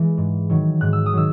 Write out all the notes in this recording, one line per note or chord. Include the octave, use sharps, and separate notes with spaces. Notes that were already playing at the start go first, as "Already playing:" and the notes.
Already playing: E3 G#3
G#2
D#3 F#3
G#2 F#6
E6
D#6
D#3 F#3 E6